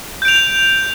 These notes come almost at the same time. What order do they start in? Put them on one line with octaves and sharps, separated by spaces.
G6 D7 F7